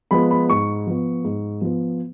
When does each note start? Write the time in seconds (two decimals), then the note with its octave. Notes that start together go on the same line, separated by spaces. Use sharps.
0.11 F3 G#3 B3 B5
0.31 B5
0.49 G#2 C#6
0.87 F3 B3
1.24 G#2
1.61 F3 B3